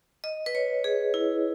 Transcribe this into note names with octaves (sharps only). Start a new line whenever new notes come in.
D#5
B4
C#5
G#4
E4